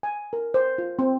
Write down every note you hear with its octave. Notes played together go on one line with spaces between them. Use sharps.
G#5
A#4
C5
F4
C4